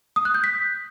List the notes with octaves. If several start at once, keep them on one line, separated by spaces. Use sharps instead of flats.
D#6
F#6
G6
B6